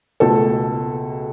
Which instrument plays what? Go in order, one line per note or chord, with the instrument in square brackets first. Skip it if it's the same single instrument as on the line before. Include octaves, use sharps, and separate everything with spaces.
[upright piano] C#2 B2 A3 A4